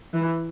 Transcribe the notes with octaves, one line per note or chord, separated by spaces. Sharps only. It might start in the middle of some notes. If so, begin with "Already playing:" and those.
E3